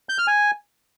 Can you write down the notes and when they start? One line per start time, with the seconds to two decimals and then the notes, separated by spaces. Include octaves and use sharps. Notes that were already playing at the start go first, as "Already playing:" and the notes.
0.09 G6
0.18 F6
0.28 G#5